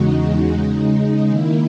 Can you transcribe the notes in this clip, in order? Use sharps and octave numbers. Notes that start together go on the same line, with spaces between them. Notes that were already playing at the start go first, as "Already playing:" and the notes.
Already playing: E2 C#3 G#3 D#4 F#4
C#3 G#3 D#4
D#3 A#3 E4